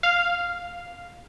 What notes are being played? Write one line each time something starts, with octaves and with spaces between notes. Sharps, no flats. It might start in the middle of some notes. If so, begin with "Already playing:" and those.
F5